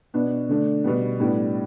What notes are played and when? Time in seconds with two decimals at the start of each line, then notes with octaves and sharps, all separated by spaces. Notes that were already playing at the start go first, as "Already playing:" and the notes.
0.14 B2 B3 D4
0.48 D3 A3 D4
0.84 B2 G3 B3
1.20 A2 G3 B3 D4